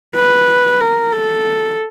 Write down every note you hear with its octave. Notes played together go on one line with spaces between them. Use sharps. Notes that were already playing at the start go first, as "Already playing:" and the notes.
B4
A#4
A4